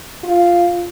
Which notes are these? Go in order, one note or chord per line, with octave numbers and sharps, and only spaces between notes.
F4